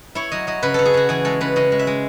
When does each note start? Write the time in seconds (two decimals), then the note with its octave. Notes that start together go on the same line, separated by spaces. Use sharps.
0.15 E4 C#5
0.32 F#3 D#5
0.47 F#3 D#5
0.63 C#3 B4
0.74 C#3 A4
0.86 G#4
0.94 C#3 F#4
1.09 E3 G#4
1.25 G#3 A4
1.41 C#3 B4
1.56 C#3 D#5
1.72 G#3
1.79 E5
1.87 G#3